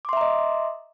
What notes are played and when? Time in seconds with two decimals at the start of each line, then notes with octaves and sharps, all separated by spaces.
0.05 D6
0.09 C6
0.13 E5
0.17 A#5
0.21 D#5